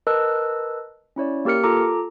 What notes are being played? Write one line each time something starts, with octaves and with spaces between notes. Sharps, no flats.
A#4 B4 D#5 A5 E6 F#6
C#4 E4 C#5 D5
A#3 G4 A#4 F6 C#7
F4 A4 A#5 D6